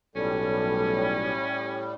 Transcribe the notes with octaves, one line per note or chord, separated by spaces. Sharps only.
B1 A2 G3 C#4 A4